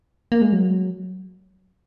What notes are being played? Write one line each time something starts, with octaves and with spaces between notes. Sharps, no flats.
A#3
G#3
F#3